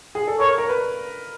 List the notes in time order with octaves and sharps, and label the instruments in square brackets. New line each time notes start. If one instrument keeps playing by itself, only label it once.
[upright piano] G#4
A4
[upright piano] A#4 [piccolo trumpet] C#5
[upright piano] A#4
B4